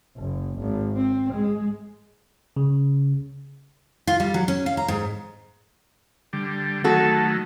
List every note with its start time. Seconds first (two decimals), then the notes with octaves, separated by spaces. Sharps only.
0.17 F#1
0.59 G#1
0.97 C4
1.33 G#3
2.56 C#3
4.07 F4
4.20 G3
4.34 F#3
4.48 C#4
4.66 F5
4.77 A#5
4.88 G#2
6.33 D3 G3
6.84 D#3 F#3 A3 F#4 A4